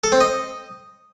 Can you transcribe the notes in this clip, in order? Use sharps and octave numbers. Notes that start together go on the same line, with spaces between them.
A4
C4
D#5